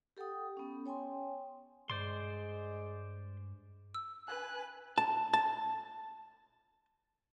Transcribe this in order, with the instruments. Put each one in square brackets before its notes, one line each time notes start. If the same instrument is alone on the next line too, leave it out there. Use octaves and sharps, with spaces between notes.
[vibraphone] G4 A4 F#5 G5 D#6
B3 C#4
C#5 G5 G#5 C6
[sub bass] G2 [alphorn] G#3 [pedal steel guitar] C5 D5 C6
[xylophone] E6
[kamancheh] B4 F#6 [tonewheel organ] G#5
[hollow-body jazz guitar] A5
A5